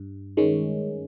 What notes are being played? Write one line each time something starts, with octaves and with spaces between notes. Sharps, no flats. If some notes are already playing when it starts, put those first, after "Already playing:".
Already playing: G2
D#3 G#3 C#4